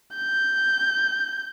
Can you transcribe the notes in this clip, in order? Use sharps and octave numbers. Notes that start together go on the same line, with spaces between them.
G6